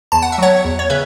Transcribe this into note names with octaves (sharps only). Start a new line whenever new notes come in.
E2 A5
F#5
E5
F#3 C#5 F#5
E2
C#5
C#3 B4 E5